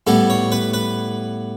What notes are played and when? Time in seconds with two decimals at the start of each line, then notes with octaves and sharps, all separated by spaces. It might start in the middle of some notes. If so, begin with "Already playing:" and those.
0.07 A2 G3 B3 A4
0.30 C#5
0.52 B4
0.74 B4